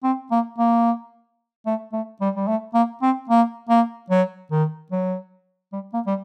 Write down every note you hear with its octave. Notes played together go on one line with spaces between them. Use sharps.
C4
A#3
A#3
A3
A3
G3
G3
A3
A#3
C4
A#3
A#3
F#3
D#3
F#3
G3
A#3
G3